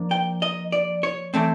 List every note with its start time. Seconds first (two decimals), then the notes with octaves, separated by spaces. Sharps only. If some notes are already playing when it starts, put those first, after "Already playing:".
Already playing: F3 A#3 D4
0.11 G5
0.42 D#5
0.72 D5
1.03 C#5
1.34 E3 A3 C4